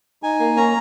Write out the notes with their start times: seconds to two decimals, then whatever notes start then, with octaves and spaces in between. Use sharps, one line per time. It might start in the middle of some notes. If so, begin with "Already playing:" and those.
0.23 D#4 G#5
0.40 A#3
0.57 C#4 A#5